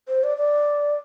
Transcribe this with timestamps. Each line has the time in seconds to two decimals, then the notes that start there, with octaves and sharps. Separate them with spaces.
0.08 C5
0.24 D5
0.37 D5